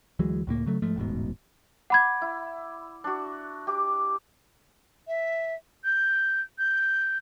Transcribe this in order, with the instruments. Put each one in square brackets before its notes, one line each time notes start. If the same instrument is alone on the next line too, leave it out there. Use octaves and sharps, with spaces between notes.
[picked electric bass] D2 E3 F#3 G#3
C#2 A2 A#3
C#3 F#3 A3
G#2 F3 A3
E1 A1 G#2 B2
[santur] D5 [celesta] F#5 B5 G#6
[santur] E4
D4 F#4
G4 D6
[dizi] E5
G6
G6